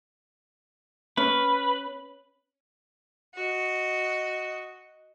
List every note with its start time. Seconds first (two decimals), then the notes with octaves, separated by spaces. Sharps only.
1.17 C#4 B4
3.35 F#4 D#5